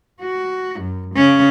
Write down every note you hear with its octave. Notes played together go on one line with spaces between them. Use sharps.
F#4
F#2
C#3 C#4